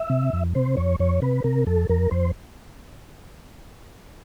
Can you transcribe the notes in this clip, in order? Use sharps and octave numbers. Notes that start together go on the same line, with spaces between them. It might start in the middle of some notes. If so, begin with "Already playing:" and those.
Already playing: E5
C3
F2
C3 C5
F2 C#5
F2 C#5
C3 B4
C3 A#4
F2 A4
F2 A#4
F2 C5